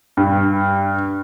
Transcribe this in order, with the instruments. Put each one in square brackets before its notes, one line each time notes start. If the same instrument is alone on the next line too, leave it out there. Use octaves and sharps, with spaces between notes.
[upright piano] G2